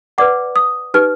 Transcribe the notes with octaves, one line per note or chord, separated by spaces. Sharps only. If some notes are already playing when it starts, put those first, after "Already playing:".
B4 D5 F#5 D6
D#6
D#4 G4 B4 F6